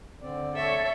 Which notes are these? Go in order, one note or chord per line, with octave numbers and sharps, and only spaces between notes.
D3 C4 D5
A4 C#5 E5